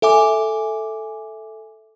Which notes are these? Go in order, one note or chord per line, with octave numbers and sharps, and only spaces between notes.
A4 E5 G#5 D6